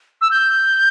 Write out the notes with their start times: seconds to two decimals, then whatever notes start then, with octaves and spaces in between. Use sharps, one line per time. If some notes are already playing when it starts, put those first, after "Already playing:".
0.21 E6
0.31 G6